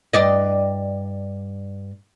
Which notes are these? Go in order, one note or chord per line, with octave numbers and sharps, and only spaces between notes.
G2 D5 D#5